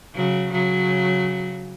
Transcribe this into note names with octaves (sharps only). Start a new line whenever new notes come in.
C#3 F#3
C#3 F#3